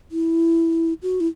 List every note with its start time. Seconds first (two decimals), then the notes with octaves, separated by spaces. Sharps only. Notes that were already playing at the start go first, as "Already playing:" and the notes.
0.11 E4
1.02 F#4
1.20 E4